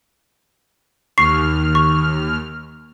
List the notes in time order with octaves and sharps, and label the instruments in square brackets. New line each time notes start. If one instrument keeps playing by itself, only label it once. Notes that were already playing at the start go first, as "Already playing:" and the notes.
[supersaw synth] D#2 F6 [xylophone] C#6 C7
[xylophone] C#6